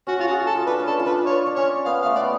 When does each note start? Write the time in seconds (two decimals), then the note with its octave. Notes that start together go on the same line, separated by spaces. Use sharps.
0.07 C#4 F#4
0.19 F4 A4
0.28 F#4
0.31 G#4
0.43 F#4 A4
0.55 F4
0.67 D4 B4
0.79 C#4
0.87 D4 A4
1.00 F4
1.06 D4 B4
1.27 F4 C#5
1.47 D4
1.56 C#4 C#5
1.86 B3 F5
2.02 F5
2.06 A3
2.16 B3 D5